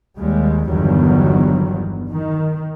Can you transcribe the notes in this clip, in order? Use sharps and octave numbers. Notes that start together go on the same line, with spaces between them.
D#2 G3 G#3
G1 E2 D#3 F#3 G3
D#3